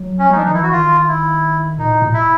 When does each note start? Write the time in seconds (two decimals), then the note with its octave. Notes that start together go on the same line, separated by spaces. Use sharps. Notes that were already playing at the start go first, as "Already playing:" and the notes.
Already playing: F#3
0.19 C#4
0.30 F#3 D#4
0.37 F3 D4
0.45 D#3 D#4
0.54 E3 E4
0.63 F#4
0.72 D#3 F4
1.08 E4
1.79 A#2 D#4
1.90 A2
2.02 A#2
2.14 E4